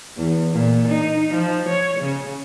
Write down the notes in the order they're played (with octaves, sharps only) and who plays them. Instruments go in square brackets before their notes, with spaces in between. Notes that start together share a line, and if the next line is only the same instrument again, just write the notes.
[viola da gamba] E2
A#2
D#4
F3
C#5
C#3